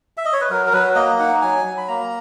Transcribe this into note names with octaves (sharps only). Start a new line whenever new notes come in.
E5
D#5
C#5
B4
F#3 A#4
A#4
F#3 B4
A#3 D#5
D#4 F#5
F#3 G#5
F#3
B5
A#3 A#5